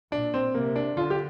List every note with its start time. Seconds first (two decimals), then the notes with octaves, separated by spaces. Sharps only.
0.12 A#2 D4
0.34 C4
0.55 C3 A#3
0.76 D4
0.97 D3 F4
1.10 G4